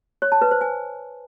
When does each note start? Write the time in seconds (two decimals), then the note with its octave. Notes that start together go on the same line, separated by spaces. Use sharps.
0.22 C#5
0.32 A5
0.42 B4
0.51 C5
0.61 G#5